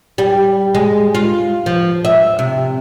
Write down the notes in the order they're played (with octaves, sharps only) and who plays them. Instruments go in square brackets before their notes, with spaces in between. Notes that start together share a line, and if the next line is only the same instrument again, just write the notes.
[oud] G3
G#3
F4
F3
E5
C3